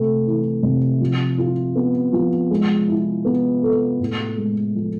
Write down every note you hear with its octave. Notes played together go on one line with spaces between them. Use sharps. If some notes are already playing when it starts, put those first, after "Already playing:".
Already playing: C3 A3
E3
C3
F3
F4
B3
F3
G#3
E4
B3
A4
A2
G#3
F3